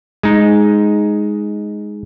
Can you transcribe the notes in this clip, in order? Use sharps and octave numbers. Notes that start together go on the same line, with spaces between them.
G#3 D#4